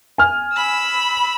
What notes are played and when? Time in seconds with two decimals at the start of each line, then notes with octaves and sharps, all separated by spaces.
0.18 G#5 F6
0.54 B5 E6